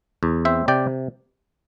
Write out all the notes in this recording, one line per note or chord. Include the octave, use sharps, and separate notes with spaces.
E2
C4 C5 E5
C3 D5 G5